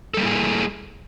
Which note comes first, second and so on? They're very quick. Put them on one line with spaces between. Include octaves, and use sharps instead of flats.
A4 G3 A#3 E4 G#4